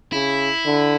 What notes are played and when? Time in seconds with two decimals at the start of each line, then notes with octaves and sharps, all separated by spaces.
0.12 C#3 E4
0.65 D3